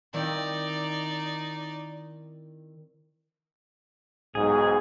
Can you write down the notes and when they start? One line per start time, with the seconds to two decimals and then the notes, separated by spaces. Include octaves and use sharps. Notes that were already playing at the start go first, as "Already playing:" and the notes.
0.13 D#3 C4 D#4 E4 D5
4.35 B1 G#2 G#4